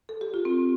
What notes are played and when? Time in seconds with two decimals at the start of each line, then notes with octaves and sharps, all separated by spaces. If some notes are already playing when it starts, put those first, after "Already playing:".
0.09 A4
0.21 G4
0.34 F4
0.45 C4